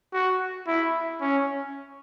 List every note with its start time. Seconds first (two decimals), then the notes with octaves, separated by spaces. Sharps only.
0.13 F#4
0.67 E4
1.21 C#4